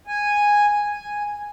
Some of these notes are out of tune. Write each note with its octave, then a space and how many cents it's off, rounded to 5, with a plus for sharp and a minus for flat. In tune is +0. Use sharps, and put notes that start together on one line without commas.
G#5 -5
G#5 -5